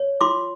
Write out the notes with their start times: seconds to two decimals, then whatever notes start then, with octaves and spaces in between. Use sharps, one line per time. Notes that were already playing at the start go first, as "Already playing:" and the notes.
Already playing: C#5
0.21 F4 C6 D6